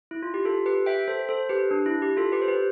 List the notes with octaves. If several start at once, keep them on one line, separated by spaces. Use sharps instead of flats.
E4
F4
G4
F4 A4
G4 B4
E5 G5
A4 C5
A4 C5
G4 B4
D4
E4
G4
F4 A4
G4 B4
C5
G4 B4